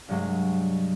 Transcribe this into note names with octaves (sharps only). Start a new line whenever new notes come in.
C2 G2 F#3 G#3